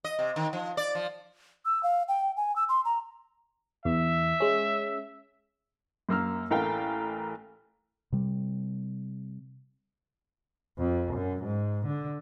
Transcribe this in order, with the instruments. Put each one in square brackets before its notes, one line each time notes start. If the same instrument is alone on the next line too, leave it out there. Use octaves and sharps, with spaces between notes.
[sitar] D#5
C3
D#3
F3
D5
F3
[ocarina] E6
F5
G5
G#5
E6
C6
A#5
[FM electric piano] E2 [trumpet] E5
[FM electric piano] G#3 C#4
[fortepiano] F#2 A#3 E6 F6
A1 A3 A#4 F5 G5
[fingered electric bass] C3 G3
[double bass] F2
F#2
G#2
D3